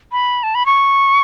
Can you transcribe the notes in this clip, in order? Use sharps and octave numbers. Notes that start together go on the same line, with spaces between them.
B5
A5
B5
C#6